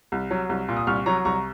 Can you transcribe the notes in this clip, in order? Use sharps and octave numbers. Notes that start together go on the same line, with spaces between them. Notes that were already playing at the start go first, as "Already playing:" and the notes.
C2
F#3
C2
A#2
D#6
C2 C#6 F6
F#3 A#5 C#6
C2 A#5 C#6